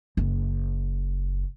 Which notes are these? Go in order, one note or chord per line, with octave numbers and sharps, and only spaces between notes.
F#1